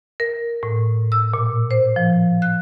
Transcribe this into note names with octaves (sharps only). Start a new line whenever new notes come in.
A#4
A2
E6
A#2
C5
F3
F#6